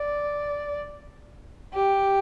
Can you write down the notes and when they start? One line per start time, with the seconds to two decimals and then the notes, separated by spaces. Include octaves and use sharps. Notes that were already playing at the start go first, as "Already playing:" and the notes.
Already playing: D5
1.74 G4